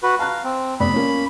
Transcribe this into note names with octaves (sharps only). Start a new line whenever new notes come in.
F#4 B4
F5 A5 A#5 F#6
C4
F1 B3 D5 B5
A#3 C#4